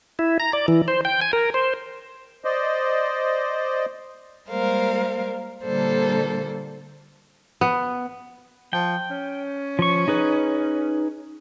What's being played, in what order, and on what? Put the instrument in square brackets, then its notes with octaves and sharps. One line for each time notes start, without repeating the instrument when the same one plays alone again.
[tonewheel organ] E4
A#5
D5
E3
C5
G5
G#5
A#4
C5
[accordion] C5 D5 D#5
[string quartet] G3 G#3 A#3 A#4 C5 F5
A#2 D3 G3 A#3 A4 C5
[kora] B3
[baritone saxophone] F3 [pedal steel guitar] G5
[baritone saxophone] C#4
[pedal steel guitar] F3 C#6
D#4 G#4 B4